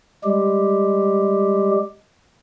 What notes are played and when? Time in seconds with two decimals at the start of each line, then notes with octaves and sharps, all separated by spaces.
0.24 G3 G#3 G4